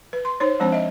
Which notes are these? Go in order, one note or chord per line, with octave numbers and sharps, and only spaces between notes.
B4
C6
D#4 C5 C#5
F3 G#3 C4 D4 C5 A5
D#5 E5